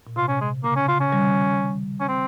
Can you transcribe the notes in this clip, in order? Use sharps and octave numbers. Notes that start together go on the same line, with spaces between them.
A#2
C3 F4
C#4
G#3
C#3 A#3
C#4
C#3 F4
C#4
D#3 G3
C#4
C4